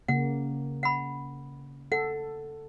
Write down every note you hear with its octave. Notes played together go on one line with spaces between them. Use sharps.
C#3 A#3 F#5
F#5 B5
A4 F#5